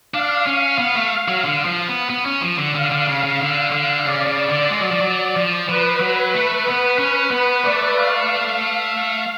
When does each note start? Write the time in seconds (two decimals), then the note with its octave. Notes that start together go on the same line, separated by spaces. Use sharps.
0.14 D4 F5
0.46 C#4
0.79 B3
0.95 A3
1.28 F#3
1.45 D3
1.65 F3
1.88 B3
2.10 B3
2.26 C#4
2.42 F3
2.58 D3
2.75 D3 F5
2.91 D3
3.07 C#3
3.24 C#3
3.41 D3
3.72 D3
4.05 C#3 D5
4.27 C#3
4.48 D3
4.71 G#3
4.80 F#3
4.91 F3
5.01 F#3
5.36 F3
5.68 F3 B4
6.00 F#3
6.34 A3
6.66 B3
6.99 C#4
7.31 B3
7.64 A3 D5
7.97 F5
8.61 F5